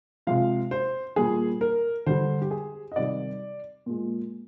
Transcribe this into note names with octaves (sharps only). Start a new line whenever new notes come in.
C3 F3 G#3 F5
C5
A#2 G3 G#4
A#4
D3 G3 C5
G4
G#4
D#5
C3 D#3 G3 D5
A#2 G#3